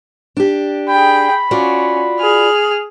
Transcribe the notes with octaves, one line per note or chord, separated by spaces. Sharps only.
D4 G4
G#4 G5 B5
C#4 F4 F#4 D5
G#4 F6